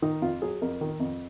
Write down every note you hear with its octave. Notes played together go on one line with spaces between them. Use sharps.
D#3 D#4
F2 F4
F#3 G#4
F2 A#4
D#3
F2